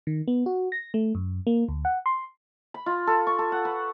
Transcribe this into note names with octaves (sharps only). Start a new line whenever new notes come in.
D#3
B3
F#4
A#6
A3
F#2
A#3
D2
F#5
C6
B5
F4
A4
C#6
A4
F#5
B4